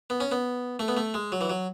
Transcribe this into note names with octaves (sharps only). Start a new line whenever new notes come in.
B3
C#4
B3
A3
B3
A3
G#3
F#3
E3
F#3